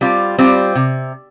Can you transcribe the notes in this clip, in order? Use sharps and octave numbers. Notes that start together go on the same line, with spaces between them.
G3 C4 F4
G3 C4 F4
C3